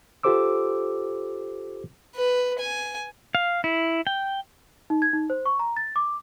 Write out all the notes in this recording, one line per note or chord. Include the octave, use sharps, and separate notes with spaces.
F4 G4 A4 C5 D6 E6
B4
G#5
F5
E4
G5
D#4
G#6
D#4
C5
C#6
A#5
A6
D6